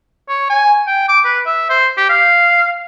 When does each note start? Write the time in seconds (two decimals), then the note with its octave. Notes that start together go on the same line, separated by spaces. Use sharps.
0.29 C#5
0.50 G#5
0.87 G5
1.09 D6
1.25 B4
1.46 E5
1.70 C5
1.97 G4
2.09 F5